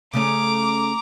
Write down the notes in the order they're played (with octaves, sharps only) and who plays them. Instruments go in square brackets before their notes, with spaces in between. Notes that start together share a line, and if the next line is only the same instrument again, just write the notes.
[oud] C#3 A3 C#4 [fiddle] A#5 D6